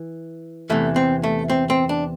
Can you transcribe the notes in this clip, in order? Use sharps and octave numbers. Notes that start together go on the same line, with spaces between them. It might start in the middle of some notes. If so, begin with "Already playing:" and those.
Already playing: E3
E2 C3 E3 A3
C4
A3
C4
C4
D4